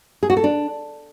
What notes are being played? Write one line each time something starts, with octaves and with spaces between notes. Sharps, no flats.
G#4
F#4
A4
D4